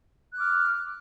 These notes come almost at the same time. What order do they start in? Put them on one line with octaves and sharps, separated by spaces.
F#6 D6 F6